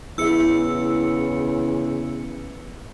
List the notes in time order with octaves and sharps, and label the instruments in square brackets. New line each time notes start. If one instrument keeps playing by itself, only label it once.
[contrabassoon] E2 [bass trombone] C#3 [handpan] E4 G#4 E5 [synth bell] E6 C#7